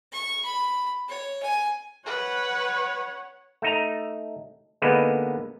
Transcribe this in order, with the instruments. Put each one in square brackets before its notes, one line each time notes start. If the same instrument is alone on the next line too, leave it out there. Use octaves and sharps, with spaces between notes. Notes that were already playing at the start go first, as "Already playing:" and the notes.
[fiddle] C#6
B5
C#5
G#5
[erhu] B4 [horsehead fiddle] C#5 F#5
[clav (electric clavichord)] A3 D#4 A#5
D3 G#3 A#3 B3 D#4 B4